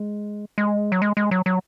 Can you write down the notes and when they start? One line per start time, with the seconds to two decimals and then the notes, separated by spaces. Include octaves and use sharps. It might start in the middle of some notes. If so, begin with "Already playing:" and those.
Already playing: G#3
0.58 G#3
0.92 F#3
1.02 G#3
1.17 G#3
1.31 F#3
1.46 F#3